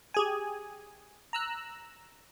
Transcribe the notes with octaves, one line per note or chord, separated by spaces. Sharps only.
G4 G#4 G#5
A#5 E6 F#6